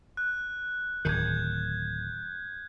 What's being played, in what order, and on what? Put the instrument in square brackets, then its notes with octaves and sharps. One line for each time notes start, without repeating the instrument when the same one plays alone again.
[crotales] F#6
[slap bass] D1 D#3 [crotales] G6 G#6